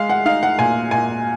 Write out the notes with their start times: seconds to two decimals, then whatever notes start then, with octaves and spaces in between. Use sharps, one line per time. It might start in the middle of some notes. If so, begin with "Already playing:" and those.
Already playing: G#3 F5
0.09 F#5
0.25 D#4 F5
0.43 F#5
0.58 A#2 G#5
0.91 A#2 G#5